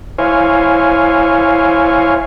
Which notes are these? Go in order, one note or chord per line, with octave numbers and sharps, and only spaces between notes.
E4 C5 C#5 F5 G#5